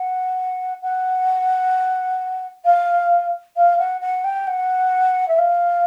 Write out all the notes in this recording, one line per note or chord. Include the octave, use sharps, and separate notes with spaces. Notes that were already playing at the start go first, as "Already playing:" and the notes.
Already playing: F#5
F#5
F5
F5
F#5
F#5
G5
F#5
E5
F5